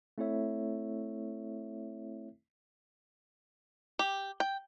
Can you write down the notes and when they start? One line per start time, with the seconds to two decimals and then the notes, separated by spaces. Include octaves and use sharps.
0.18 A3 C4 E4 A4 C#5 E5
3.99 G4
4.40 G5